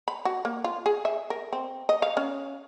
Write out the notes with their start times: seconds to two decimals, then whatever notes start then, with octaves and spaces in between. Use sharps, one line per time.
0.08 B5
0.25 F#4
0.45 A#3
0.64 F4
0.86 G#4
1.05 E5
1.30 A#4
1.53 C4
1.89 D#5
2.02 F5
2.17 C#4